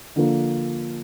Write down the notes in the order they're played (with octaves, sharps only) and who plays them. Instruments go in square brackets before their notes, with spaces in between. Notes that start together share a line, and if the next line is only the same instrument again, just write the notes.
[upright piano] D3 F3 A#3